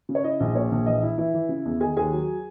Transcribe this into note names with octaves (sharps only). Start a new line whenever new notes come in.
C#3
C#5
E4 D#5
A#1
A#2 C#5
A#1
E3 D#5
E3 E4 E5
E3 E4 E5
E3
C#3
E2
D#3 G#4 G#5
D#2 G#4 G#5
F#3